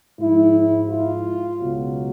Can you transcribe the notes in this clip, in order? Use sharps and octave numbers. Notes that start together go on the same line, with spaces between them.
G#2 F3 E4
F4
C#2 B2 F#3